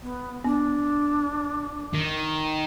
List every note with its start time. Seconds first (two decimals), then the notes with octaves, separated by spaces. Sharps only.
0.03 B3
0.44 B3 D4
1.94 D#3